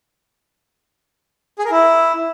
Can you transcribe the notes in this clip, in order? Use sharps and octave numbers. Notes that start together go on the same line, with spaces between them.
G#4
A#4
E4